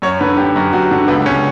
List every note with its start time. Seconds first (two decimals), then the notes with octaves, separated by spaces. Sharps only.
0.02 F#2 C#5
0.21 D3 B4
0.37 D3 G4
0.56 F#2
0.73 F#2 F#4
0.91 D3
1.08 C#2 B3
1.26 C#2 C#4